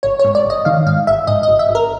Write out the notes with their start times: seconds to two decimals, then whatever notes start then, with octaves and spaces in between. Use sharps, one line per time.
0.03 G#1 C#5
0.19 C#5
0.25 G#2
0.35 D5
0.45 G#1
0.50 D#5
0.65 D#3 F5
0.86 G#2 F5
1.07 G#1 E5
1.27 G#2 D#5
1.43 G#1 D#5
1.59 E5
1.69 G#1
1.75 A#4